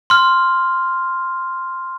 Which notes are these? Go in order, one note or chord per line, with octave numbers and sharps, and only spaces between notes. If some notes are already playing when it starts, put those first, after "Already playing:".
C6 F6